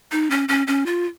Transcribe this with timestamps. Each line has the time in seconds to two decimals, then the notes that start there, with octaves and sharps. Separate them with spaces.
0.12 D#4
0.31 C#4
0.49 C#4
0.67 C#4
0.86 F4